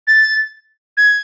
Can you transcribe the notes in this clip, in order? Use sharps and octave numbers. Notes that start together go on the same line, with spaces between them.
A6
G#6